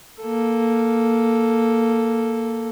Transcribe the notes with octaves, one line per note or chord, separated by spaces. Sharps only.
A#3 A4